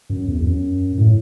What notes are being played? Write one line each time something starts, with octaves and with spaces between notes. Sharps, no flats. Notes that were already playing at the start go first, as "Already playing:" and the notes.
F#2
E2
E2
F#2
A2